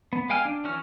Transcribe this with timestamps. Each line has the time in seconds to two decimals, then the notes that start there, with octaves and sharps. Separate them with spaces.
0.13 B3
0.29 G#3 F5 G5 G#5 F6
0.45 D4
0.64 E3 F#3 C#4 F#4 F6